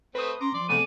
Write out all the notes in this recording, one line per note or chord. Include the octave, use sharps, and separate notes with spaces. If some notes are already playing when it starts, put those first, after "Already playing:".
A3 C4 B4 D#6
C#4 A#5 C6 D6
F3 D5 C6
C3 A3 B3 G#4 D5 D#7